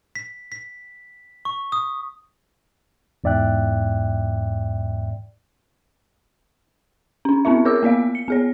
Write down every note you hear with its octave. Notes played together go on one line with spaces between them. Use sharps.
B6
B6
C#6
D#6
E2 G#2 D5 E5 G5 F#6
C#4 D4
B3 C4 D4 E4 E5
G#4 A#4 C#5 D6 E6
A#3 B3 D5 F5
C#7
B3 G#4 C#5